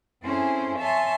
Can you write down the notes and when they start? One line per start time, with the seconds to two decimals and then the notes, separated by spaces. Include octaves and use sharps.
0.24 C4 C#4 E4 G#4 A4 C5
0.80 C#5 E5 G#5 A5 C6